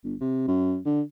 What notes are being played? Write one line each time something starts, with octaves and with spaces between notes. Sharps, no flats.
G1
C3
F#2
D3